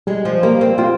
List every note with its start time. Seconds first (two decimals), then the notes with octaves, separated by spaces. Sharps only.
0.07 G3 G#3
0.25 F3
0.43 G3 A#3
0.61 C4
0.78 C4 F4